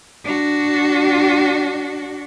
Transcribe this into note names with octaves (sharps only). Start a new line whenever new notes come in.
D4 F#4